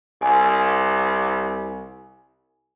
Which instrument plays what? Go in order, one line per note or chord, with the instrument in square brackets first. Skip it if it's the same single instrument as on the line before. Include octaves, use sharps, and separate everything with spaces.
[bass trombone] C2 [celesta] G#5